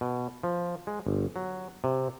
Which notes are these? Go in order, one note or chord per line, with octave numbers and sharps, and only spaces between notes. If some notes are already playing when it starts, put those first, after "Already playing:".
B2
F3
G#3
G1
F#3
C3